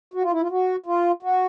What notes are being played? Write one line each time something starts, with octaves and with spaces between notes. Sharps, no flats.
F#4
F4
E4
F4
F#4
F4
F#4